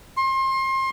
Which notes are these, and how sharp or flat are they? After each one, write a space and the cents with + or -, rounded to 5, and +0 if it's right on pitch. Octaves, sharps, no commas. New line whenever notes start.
C6 +30